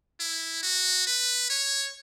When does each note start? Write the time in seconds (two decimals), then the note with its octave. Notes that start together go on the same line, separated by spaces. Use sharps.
0.20 E4
0.63 F#4
1.07 B4
1.50 C#5